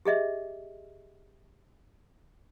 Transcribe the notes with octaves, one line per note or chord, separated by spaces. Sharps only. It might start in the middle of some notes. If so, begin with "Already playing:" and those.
G4 G#4 D#5 E5